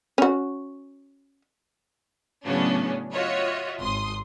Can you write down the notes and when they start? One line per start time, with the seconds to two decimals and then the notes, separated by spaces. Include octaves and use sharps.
0.18 C#4 F#4
2.45 A2 C#3 F#3 B3 C#4 D4
3.12 F4 F#4 C#5 D#5 E5
3.79 G#1 C6 D#6